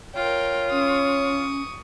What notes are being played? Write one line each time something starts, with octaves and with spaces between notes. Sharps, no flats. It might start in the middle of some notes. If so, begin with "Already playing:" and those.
F4 A#4 C#5 G5
C#4 C#6 D#6